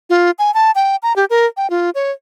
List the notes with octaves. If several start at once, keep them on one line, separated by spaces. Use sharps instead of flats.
F4
G#5
A5
G5
A#5
G4
A#4
G5
F4
C#5